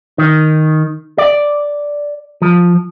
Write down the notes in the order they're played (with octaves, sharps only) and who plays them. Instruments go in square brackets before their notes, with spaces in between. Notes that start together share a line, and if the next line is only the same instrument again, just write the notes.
[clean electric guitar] D#3
D5
F3